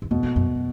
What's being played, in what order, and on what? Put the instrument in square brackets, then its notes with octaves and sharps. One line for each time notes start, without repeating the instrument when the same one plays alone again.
[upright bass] E2
[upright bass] F2 [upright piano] B2
[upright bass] F2
F#2